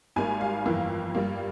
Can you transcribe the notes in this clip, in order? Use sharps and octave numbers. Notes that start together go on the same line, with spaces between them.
G#1 G#2 G3 A#3 G#5
F5
G1 F2 E3 A#3
G2 G3 A#3